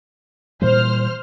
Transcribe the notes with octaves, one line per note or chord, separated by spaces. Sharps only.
A#2 E3 G3 C5 F6